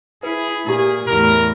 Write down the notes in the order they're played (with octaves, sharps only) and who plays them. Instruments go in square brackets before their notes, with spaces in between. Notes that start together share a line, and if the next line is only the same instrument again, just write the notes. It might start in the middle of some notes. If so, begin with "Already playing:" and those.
[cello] E4 [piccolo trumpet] G#4 [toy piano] B4
[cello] A#2 [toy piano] E4 G4 [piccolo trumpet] G#4
[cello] E2 A2 [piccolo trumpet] A#4